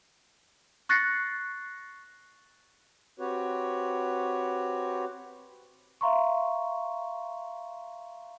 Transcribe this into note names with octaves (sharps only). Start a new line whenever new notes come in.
C#6 F#6 A6 A#6 C7 C#7
C4 F#4 G4 B4 C#5
E5 F5 A#5 C6 C#6